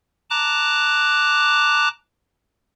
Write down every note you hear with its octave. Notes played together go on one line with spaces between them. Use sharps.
A5 A#5 D6 F#6